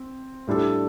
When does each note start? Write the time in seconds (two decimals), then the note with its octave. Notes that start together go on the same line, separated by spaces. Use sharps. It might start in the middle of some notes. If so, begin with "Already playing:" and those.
Already playing: C4
0.47 A2 G3 D4 A4